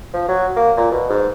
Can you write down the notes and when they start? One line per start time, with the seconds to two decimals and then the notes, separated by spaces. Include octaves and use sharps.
0.14 F3
0.29 F#3
0.56 A#3
0.77 A#2
0.91 B2
1.10 G#2